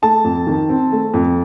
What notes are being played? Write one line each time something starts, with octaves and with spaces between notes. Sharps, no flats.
A3 A5
F2
D#3
C4
A3
F2